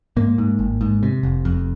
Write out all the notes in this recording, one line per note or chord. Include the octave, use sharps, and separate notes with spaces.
G#2 A#3
G#2
G#1
G#2
C3
F1
F2